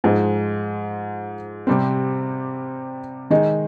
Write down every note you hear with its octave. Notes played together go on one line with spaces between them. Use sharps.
G#2 F3 G#3
C3 G3 C4
D#3 G#3 D#4